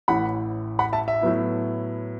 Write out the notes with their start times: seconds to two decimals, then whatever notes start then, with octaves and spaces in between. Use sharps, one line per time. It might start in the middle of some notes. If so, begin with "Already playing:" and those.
0.08 A1 A2 E3 F#5 B5
0.79 F#5 B5
0.93 E5 A5
1.08 E5
1.21 A2 F#3 B3 E4